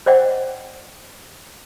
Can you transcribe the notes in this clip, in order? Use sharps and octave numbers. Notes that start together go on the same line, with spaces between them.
C5 D5 D#5 F#5 G5